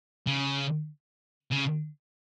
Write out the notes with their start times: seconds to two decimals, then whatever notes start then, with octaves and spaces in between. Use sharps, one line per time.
0.27 C#3
1.51 C#3